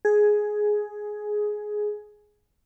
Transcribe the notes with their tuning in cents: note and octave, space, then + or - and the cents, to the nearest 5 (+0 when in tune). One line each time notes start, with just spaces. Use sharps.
G#4 +10